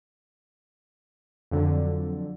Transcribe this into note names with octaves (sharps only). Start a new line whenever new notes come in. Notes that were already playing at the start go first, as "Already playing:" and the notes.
F2 D3 F#3